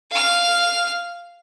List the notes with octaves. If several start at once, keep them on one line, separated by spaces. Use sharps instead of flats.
F5 F6